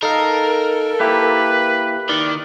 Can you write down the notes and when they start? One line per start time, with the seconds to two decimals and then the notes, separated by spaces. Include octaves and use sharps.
0.03 D#4 A4 A#4 F5
1.00 A#3 E4 G4 B4
2.09 D#3 D5